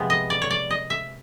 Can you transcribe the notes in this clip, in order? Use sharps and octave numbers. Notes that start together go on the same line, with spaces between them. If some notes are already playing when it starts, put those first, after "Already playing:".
Already playing: C3 F3 G#3 B3
D#5
D5
C#5
D5
D#5
E5